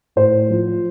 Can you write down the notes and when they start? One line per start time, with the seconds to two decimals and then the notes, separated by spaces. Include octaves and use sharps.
0.16 A2 C5
0.50 F3